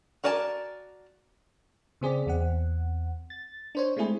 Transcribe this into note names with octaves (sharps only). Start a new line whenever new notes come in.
F#4 A#4 D5 G#5 A5
C#3 C4 G#4 D5 B6
E2 C4 F#5
A6
D4 C5 C#5
G#3 A3 C4 E4 G#4